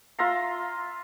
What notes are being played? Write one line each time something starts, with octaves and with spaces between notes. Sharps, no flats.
F4 E5 A#5 C6